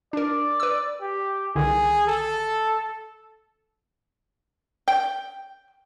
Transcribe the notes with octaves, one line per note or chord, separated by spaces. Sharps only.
D4 A#4 D5
B4 E6
G4
C2 D3 D#3 G#4
A4
G5